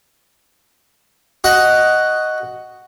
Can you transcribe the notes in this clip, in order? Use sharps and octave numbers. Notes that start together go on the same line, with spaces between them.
F#4 D#5 F#5